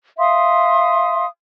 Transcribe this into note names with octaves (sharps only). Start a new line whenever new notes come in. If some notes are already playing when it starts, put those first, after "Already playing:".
E5 F5 C6 D#6